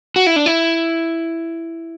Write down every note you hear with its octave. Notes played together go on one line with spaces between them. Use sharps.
F#4
E4
D4
E4